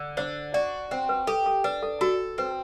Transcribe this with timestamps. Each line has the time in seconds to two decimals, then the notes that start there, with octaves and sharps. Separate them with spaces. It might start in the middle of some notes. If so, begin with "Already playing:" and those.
Already playing: D3
0.17 D4 C5
0.54 F#4 D5
0.91 C4 C5
1.09 B4
1.27 G4 A4
1.46 A4
1.64 D4 B4
1.83 A4
2.01 F#4 A4
2.38 C4 B4